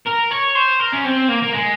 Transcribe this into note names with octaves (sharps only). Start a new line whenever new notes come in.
A#4
C#5
C5
A#4
C#4
C4
A#3
A#3
G#3